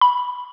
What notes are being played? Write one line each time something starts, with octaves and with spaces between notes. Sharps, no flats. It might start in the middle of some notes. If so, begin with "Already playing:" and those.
B5